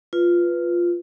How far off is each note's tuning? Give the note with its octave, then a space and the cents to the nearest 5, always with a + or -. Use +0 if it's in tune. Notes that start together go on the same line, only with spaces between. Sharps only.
F4 +0 B4 +0